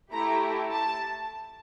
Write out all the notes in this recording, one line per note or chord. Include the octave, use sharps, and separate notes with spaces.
A3 E4 G4 A#5
A5